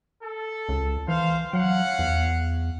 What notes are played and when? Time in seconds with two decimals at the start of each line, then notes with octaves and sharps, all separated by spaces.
0.23 A4
0.69 C#2
1.08 E3 C5 F5
1.53 F#3 C#4 F5 F#5
1.99 E2